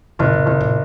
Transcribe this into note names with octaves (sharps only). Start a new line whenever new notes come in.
F#1 A#2
B2
F#1 B2
A#2